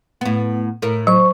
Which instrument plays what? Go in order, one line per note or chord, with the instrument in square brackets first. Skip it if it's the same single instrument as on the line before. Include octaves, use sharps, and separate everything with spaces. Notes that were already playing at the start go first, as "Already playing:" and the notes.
[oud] A2 B3
A2 A#4
[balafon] F#3 [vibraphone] C5 C#6